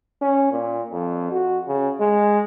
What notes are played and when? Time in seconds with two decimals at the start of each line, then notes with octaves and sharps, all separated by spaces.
0.21 C#4
0.51 A#2
0.92 F2
1.32 F#4
1.67 C#3
2.00 G#3